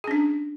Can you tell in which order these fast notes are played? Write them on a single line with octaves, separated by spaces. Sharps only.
G#4 C#4 D4